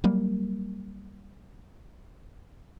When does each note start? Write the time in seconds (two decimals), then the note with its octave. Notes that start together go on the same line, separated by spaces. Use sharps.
0.04 F#3 G3 A#3